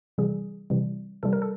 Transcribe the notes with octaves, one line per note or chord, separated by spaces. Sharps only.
C3 E3 G3 G#4
C3 E3 G3
C3 E3 G3 A4
A#4
A4